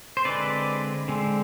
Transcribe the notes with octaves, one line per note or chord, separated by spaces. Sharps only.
C5
D3 G#3 C4 B4 D5
D3 G#3 C4